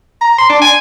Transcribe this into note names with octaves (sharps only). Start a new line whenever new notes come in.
A#5
C6
D4
G#5